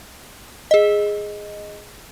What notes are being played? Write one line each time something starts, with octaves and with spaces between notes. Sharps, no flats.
G#4 D#5